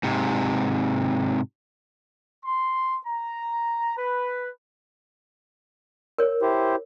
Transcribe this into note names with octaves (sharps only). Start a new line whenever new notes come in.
G#2 C3
C6
A#5
B4
A#4 C#5
E4 G4 C5